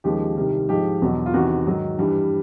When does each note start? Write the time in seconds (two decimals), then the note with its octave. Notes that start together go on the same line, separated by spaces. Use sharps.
0.04 D#2 C#3 F3 G#3 G4
0.37 C2 C3 D#3 G3
0.69 G#2 F3 G#3 G4
1.02 E2 B2 F#3
1.26 F4
1.34 E2 C3 D#3 F#4
1.67 G#2 D#3 F#3
1.99 G2 E3 G3